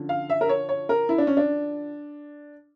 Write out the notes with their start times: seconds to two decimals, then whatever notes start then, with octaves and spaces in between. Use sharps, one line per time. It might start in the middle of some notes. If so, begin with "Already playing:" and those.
Already playing: D3 F3 C#4
0.09 F5
0.30 E5
0.41 A#4
0.49 C#5
0.69 C#5
0.89 A#4
1.09 E4
1.18 D4
1.27 C#4
1.37 D4